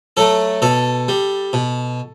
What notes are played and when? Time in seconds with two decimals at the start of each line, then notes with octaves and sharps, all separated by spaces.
0.17 F#3 A3 A4
0.62 B2 A4
1.08 G3
1.53 B2